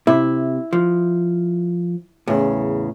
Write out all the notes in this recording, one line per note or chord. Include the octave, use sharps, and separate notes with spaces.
C3 E4
F3
E2 A2 C#3